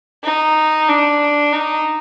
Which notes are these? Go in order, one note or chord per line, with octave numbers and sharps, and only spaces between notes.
D#4
D4
D#4